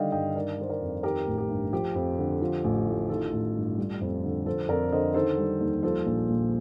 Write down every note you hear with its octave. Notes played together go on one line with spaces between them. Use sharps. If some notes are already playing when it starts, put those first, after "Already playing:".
Already playing: D3 D#3 G3 D5 D#5 F5 G5
G2 D#5 G5
D#3 A#4 D5
G3 C5
A#4 D5
F2
D#3 G4 A#4
A1
G4
G2
F3 G4
F2
D3
F3
A1
A2
D#3 F4 A4
A1
G2
G3
F2
D3
F3 A4 C5
F2 A#4 D5
D3 C5 D#5
D#3 A4 C5
G3
D#2
F3 A4 C5
A#1
A#2